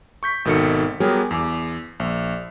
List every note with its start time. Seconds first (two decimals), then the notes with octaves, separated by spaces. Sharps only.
0.23 C#6 G6 B6
0.45 G#1 B2 D#3 A4 C#7
1.00 F#3 G3 B3 G4 G#4 A#4
1.31 E2 D6
2.00 A#1